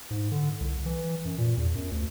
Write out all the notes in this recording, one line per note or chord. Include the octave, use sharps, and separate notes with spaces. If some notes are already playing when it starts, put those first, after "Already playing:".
G#2
D3
C2
E3
F#2
A#2
E2
F#2
D2